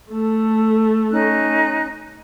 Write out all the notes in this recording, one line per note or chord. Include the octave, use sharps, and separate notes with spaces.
A3 A4
C#4 D#4 F#6